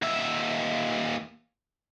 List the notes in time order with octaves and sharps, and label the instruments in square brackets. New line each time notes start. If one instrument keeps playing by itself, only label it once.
[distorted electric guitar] D#2 E5